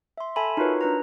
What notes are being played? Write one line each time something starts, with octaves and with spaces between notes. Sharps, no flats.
E5 C6
A4 E5 G#5 A5 B5
D#4 F4 F#4 A#4 B4 C#5
D4 B4 A#5